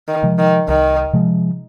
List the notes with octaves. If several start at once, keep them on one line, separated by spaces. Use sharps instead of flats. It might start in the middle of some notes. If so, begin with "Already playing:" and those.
D#3
C3 F3 G#3
D#3
C2 D#3
C3 F3 G#3